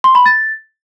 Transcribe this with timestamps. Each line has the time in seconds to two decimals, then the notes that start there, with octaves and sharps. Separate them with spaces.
0.04 C6
0.15 B5
0.26 A6